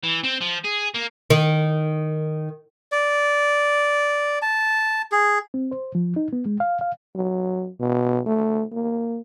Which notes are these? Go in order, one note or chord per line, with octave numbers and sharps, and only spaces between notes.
E3
C4
F3
G#4
A#3
D#3
D5
A5
G#4
C4
C5
F3
D#4
B3
G#3
F5
F5
F#3
B2
A3
A#3